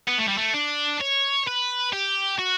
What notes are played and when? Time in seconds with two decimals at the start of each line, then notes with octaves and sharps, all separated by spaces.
0.08 B3
0.18 A3
0.28 G3
0.38 A3
0.54 D4
1.00 C#5
1.47 B4
1.93 G4
2.39 F#4